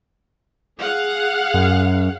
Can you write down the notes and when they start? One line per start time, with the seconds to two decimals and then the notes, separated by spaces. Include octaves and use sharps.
0.79 G#4 F5 F#5
1.54 F#2